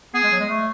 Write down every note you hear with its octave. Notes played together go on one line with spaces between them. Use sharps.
B3 G#4
G#3
F#3
G#3
A3